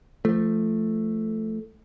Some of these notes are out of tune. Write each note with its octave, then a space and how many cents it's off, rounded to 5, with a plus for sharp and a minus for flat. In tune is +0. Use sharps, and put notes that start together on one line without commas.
F3 -25 A3 +0